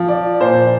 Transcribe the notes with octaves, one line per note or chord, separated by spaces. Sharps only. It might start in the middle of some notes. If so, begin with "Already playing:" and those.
Already playing: F3
D5
A#2 C5